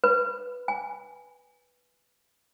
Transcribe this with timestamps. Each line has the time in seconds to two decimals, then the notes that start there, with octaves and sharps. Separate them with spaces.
0.04 B4
0.68 G#5